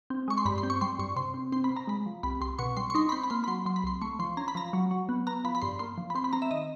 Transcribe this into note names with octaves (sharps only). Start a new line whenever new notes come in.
C4
G#3 C#6
C6
G2 B5
C6
C4
C#6
G3 C6
G2 C#6
C3 C6
C4
C4 C6
B5
C3
A#5
G#3 B5
F3
C2 B5
C2 C6
B2 C#6
G3 C6
C#6
D#4 C6
B5
C4 C6
B5
A#3 C6
B5
F#3 C6
F#3 C6
B5
C2 C6
A3 C#6
F3 C6
C#4 A#5
B5
F3 A#5
F#3
F#3
B3
B3 A#5
F3 B5
B5
G2 C6
A#3 C6
F3
B5
C4 C6
B5
C4 A#5
E5
D#3 D#5